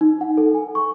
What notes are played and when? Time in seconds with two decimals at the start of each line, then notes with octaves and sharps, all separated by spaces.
0.01 D#4
0.21 F#5
0.37 A4
0.55 G#5
0.75 C#6